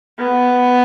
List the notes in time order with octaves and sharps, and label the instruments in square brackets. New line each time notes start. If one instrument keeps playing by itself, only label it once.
[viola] B3